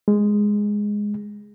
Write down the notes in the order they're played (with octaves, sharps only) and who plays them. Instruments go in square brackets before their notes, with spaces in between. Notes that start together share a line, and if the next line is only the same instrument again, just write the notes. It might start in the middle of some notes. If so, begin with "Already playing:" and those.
[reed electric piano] G#3